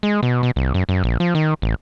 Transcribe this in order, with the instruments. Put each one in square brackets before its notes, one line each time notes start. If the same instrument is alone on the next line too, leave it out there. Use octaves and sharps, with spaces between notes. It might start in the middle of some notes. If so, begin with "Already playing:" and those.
[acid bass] G#3
B2
B2
C2
F#2
F#2
A#1
F3
D#3
A1